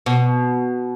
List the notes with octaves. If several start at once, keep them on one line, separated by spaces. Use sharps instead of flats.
B2